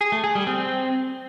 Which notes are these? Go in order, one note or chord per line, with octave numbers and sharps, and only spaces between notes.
G#4
A3
G#4
G3
C4